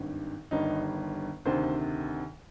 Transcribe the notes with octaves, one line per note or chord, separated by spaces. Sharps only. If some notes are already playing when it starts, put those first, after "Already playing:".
Already playing: G#1 G2 D#3
G1 G2 D#3 D#4
D2 C3 D#3 C5